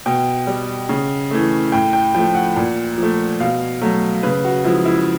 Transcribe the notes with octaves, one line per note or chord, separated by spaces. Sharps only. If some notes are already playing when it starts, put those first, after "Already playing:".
B2 G5
G3
C#3
E3 A3
A2 G5
G5
F3 A3 G5
F#5
A#2
F3 A3
B2 F5
F#3 A3
C#3 B4
F#4
F3 G#3 E4
E4